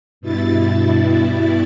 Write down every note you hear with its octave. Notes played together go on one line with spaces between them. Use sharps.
G2 B2 E4 A6